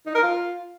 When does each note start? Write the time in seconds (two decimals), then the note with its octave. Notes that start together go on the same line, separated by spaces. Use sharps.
0.06 D#4
0.15 A#4
0.23 F4